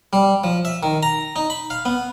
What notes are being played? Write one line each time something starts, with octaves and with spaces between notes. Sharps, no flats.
G3
F3
E5
D#3
A#5
D#4
B5
F5
B3